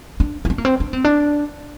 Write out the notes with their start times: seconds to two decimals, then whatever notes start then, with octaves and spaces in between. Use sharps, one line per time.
0.20 D4
0.45 D#4
0.50 D4
0.58 A#3
0.65 C4
0.80 D4
0.93 C4
1.04 D4